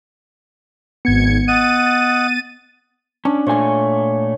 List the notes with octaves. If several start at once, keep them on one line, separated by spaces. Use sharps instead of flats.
G#1 B3 G#6 C#7
D#5 F#5 A6 D#7
C#4 D4
A#2 A3 C#5 G#5 C#6